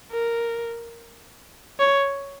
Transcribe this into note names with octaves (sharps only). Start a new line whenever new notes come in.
A#4
C#5